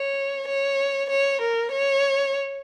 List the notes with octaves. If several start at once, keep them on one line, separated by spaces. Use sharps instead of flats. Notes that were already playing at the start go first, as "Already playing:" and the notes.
Already playing: C#5
C#5
C#5
A#4
C#5